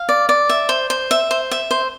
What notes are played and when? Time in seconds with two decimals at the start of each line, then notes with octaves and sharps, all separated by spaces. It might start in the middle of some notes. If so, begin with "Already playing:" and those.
Already playing: F5
0.09 D5
0.29 D5
0.49 E5
0.69 C5
0.90 C5
1.11 E5
1.31 C5
1.51 E5
1.71 C5